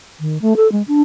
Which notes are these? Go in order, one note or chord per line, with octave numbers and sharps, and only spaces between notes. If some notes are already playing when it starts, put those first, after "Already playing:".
D#3
A3
A4
G#3
D4